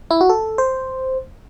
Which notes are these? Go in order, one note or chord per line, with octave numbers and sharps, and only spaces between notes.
E4
F#4
A4
C5